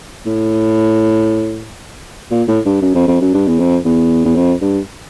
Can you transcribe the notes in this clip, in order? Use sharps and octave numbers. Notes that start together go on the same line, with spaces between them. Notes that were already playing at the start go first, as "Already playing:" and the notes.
A2
A#2
A2
G2
F#2
F2
F2
F#2
G2
E2
F2
E2
E2
F2
G2